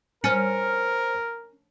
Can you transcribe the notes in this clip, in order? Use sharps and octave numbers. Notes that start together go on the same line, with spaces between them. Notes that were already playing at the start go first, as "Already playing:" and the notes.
C#4 A#4 C5 F6 C#7